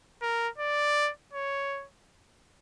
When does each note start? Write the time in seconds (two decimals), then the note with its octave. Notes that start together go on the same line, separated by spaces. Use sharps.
0.22 A#4
0.58 D5
1.33 C#5